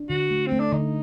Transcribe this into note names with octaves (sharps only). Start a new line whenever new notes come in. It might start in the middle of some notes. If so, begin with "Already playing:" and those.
Already playing: D4
D3 F#4
A3
C4
A3
D4
D3 D#4